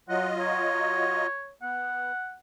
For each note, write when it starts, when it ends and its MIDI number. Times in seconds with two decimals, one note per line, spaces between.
0.09 1.27 54
0.09 1.27 65
0.09 1.27 75
0.09 0.29 78
0.40 1.51 73
1.62 2.12 59
1.62 2.36 78